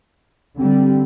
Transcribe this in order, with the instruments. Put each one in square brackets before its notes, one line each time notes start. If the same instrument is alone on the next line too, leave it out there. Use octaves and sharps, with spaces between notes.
[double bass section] D3 G3 [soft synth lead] C4